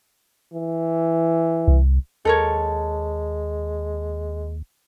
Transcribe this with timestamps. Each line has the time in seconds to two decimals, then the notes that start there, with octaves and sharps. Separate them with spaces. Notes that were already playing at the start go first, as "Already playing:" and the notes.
0.54 E3
1.68 C2
2.25 D#2 G#3 A4 A#4 C#5